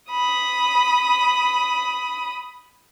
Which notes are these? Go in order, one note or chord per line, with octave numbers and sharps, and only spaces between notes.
B5 D#6